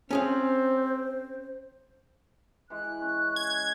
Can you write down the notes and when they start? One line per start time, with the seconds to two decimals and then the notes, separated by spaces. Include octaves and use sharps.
0.11 C4 C#4 G#4 C5 F5
2.70 E3 G#3 F#6
3.01 C#4
3.36 G#6